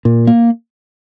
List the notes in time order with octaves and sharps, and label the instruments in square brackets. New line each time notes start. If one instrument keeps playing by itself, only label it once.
[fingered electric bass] A#2
A#3